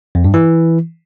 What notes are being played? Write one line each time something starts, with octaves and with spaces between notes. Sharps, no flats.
F2
G2
E3